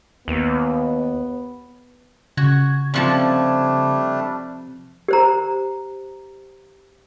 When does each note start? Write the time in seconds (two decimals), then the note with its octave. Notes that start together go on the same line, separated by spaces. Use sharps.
0.28 D#2 B3
2.37 C#3 F#4 G#6
2.94 C3 F3 G3 A3 D4 A5
5.08 G4 C5 A#5